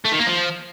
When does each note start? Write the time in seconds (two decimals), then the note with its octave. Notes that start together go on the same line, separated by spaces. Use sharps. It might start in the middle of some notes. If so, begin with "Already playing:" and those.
0.05 A3
0.12 D#3
0.20 A#3
0.27 F3